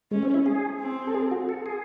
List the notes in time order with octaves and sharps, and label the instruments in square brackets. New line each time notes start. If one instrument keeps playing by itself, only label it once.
[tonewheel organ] G#3 [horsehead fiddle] C#4
[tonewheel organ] C4
E4
G#4
[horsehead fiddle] C4
[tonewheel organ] A4
G#4
F#4
A4
G#4